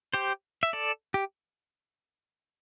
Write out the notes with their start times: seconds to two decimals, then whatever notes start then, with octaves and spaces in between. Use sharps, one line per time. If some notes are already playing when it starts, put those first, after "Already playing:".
0.14 G4 C5
0.63 E5
0.73 A4 D5
1.14 G4